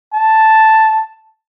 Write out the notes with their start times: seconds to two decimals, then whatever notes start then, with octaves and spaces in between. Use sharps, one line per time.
0.14 A5